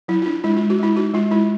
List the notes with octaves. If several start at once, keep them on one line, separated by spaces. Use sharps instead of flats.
F#3 E4
F4
D4 E4
G#3 E4
F4
G#3
F#4
G#3 E4
D#4 F#4
G#3 F4
G#3 E4